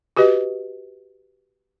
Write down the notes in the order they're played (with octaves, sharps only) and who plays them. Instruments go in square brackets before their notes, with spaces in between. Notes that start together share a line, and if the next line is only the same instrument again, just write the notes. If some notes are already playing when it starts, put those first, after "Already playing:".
[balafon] F#4 G4 B4 D#5